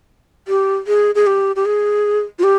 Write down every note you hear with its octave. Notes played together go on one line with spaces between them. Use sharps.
G4
G#4
G#4
G4
G4
G#4
F4
G4